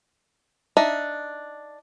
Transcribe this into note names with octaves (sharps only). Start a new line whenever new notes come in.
D4 D#4 E5